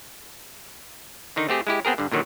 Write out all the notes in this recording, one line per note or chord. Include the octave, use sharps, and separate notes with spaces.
D3 D#3 D#4
A3 C4 G4 G#4
G#3 E4 G4
B3 C4 G#4 A#4
G2 D3
A#2 D3 D#3 F#3